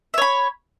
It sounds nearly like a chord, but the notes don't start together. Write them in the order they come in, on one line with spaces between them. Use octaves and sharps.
E5 C#5 B5